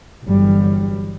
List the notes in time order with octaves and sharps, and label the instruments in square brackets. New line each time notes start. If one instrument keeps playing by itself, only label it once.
[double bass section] G1 E3 F#3 G3